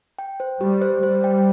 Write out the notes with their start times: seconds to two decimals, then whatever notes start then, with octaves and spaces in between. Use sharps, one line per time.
0.19 G5
0.40 C5
0.61 G3 G4
0.81 C5
1.03 G3 C5
1.24 G5